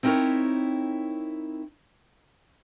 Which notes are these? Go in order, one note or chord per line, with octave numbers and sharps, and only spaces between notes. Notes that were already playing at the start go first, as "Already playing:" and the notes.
C4 D#4 E4 A#4 C#5